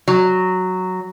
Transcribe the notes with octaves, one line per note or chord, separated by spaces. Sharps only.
F#3